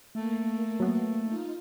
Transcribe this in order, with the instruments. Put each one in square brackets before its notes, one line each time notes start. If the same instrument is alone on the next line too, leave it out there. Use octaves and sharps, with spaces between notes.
[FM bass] A3 [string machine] A#3
[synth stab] F#3 B3
[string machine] D#4 F4